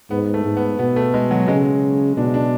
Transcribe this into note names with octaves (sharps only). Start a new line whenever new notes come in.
G#2 B3
A3
G#2
B3
B2 B3
A3
G#3
F#3
C#3 G#3
B2 D4
D4